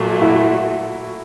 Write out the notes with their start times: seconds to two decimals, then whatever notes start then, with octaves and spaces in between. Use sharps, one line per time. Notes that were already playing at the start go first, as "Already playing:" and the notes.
Already playing: A#2 F#3 A3
0.22 E4 F#4